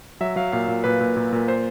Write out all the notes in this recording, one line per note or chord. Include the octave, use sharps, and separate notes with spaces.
F#3 E5
F#3 F5
A#2 F5
A#2
A#2 B4
A#2
A#2
A#2
C5